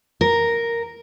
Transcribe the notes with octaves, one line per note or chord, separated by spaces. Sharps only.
A#4